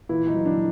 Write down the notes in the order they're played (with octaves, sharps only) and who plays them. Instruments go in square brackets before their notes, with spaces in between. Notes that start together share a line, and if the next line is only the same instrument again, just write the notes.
[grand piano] A#2 E3 E4
D#3 D#4
F#3
D3 D4
A#2